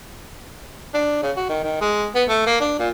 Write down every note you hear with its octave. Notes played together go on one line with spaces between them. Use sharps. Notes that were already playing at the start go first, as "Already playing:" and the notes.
D4
C#3
F#4
D#3
D#3
G#3
B3
A3
A#3
D4
A#2